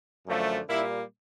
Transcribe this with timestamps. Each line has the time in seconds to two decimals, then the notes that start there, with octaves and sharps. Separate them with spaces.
0.27 F#2 D3 F3 A3
0.69 A#2 G3 A#3 E4